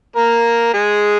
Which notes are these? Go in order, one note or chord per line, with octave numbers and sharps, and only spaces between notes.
A#3 A#4
G#3 G#4